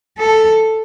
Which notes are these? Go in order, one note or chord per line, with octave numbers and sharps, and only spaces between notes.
A4